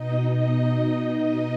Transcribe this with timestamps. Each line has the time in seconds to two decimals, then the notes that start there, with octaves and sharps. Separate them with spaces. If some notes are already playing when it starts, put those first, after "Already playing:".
Already playing: B2 D#4 D#5
0.31 D#4 D#5